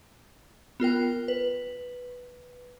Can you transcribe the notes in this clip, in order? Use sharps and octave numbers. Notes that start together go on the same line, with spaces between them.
B3 F4 A#4 G5
B4